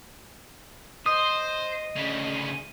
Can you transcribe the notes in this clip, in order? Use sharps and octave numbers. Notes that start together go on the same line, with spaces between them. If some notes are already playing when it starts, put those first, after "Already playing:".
C5 D#5 D#6
D2 C#3